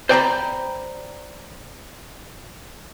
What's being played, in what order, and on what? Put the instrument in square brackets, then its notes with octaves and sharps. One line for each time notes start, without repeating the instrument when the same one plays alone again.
[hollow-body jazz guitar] C5 D5 G5 G#5 A#5 B5